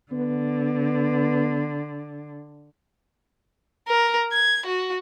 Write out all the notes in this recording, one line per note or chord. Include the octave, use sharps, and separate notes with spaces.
D3 B3
A#4
G#6
F#4